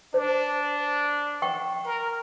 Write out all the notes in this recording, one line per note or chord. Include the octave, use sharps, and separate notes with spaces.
D4 C5
F#5 G5 C#6
A#4